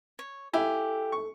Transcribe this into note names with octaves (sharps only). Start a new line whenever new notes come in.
C#5
E4 G4 A4 F5 G#5
C#6